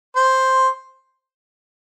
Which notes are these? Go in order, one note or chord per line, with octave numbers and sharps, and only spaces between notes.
C5